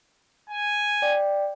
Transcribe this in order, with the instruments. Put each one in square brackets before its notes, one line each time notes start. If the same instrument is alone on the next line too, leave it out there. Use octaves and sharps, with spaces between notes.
[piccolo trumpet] G#5
[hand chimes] D5 G5